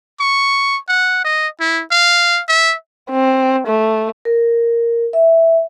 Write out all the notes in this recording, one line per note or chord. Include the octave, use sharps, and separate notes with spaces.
C#6
F#5
D#5
E4
F5
E5
C4
A3
A#4
E5